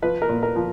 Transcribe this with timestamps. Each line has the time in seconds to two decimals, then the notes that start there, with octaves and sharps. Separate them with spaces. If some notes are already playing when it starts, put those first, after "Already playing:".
0.02 F3 B4
0.22 A#4
0.29 A#2
0.43 A#4
0.56 F3